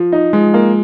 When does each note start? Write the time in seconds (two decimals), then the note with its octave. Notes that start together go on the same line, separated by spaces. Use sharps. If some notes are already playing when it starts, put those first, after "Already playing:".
Already playing: F3
0.12 D#4
0.33 F3 G#3
0.54 A#3